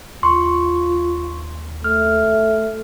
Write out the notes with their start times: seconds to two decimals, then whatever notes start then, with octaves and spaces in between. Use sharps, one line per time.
0.23 D#2 F4 C6 C#6
1.84 A3 F6